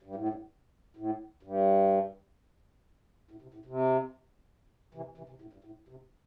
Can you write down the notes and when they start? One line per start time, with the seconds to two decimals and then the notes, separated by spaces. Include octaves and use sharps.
0.02 G2
0.15 A2
0.29 G2
0.97 A2
1.43 G2
3.31 A2
3.42 C3
3.54 A2
3.66 C3
4.94 C3 E3
5.17 C3 E3
5.29 C3
5.41 A2
5.53 G2
5.64 A2
5.88 C3